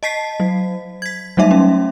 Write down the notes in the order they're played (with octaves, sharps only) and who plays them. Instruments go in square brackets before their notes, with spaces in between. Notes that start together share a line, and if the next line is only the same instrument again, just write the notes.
[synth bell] D#5 A5 B6 C7
F#3
G#6 B6
F#3 G3 A3 D#4 E5
C#4